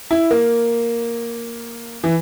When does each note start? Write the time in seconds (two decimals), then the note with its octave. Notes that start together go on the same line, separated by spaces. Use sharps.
0.11 E4
0.31 A#3
2.04 E3